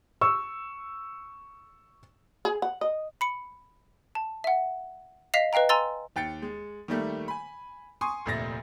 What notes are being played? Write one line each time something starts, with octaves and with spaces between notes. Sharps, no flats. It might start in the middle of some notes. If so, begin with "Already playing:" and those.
C#6 E6
G#4
F#5
D#5
B5 C#7
A5
E5 F#5
D#5 F5 B6 C7 F7
B4 D#5 F5 G5 A#5
G#5 A#5 C6 E6 A6
D#2 G5 A6 C#7
G#3
D#3 G3 A3 A#3
G#5 B5
G#5 C6 C#6 D#6
F1 D2 A#2 E5 A6 A#6